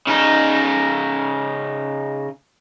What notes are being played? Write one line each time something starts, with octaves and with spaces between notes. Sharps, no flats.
C#3 D#4